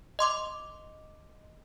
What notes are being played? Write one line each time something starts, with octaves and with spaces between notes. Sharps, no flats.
D#5 C6 D6